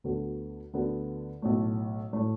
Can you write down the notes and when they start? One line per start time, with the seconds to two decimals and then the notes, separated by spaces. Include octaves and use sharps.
0.04 D2 D3 B3 F#4 A4
0.73 D2 D3 B3 F#4 A4
1.42 B1 A2 A3
2.13 A2 A3